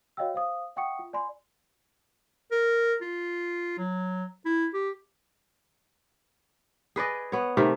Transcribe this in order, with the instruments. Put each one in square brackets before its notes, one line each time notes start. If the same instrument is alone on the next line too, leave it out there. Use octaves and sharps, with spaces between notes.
[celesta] F#4 C#5 D#5 F5 G5 E6
C5 F5 D#6
E5 F#5 G5 C#6 D#6 C#7
F4
D5 G#5 B5 C6
[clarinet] A#4
F4
F#3
E4
G4
[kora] G#4 B4 D5 D#5
B3 C#5
C3 D#3 A3